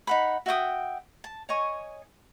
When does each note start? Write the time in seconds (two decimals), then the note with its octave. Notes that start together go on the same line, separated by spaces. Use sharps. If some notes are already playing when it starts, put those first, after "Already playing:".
0.07 D#4 F#5 B5
0.46 F#4 E5 G5 D#6
1.24 A5
1.49 C#5 D#5 G#5 C#6